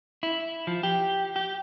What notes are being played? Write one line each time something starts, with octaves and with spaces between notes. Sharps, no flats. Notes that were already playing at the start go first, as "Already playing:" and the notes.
E4
F3
G4
G4